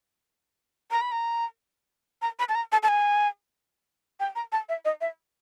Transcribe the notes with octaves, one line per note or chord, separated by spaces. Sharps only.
A#5
B5
A#5
A#5
B5
A5
A#5
A5
A5
G#5
G5
A#5
A5
E5
D#5
E5